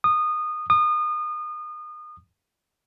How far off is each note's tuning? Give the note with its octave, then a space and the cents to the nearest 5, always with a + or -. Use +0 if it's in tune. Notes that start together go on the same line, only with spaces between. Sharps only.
D#6 -20
D#6 -30